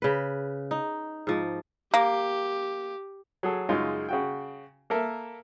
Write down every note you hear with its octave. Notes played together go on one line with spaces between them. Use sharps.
C#3 B4
D#4
G#2 F3
A#3 G4
F#3 G#4 A4
F#2 C#3 G#3 D#4 F4
C#3 F#4 G5
A#3 A4 A#4 E5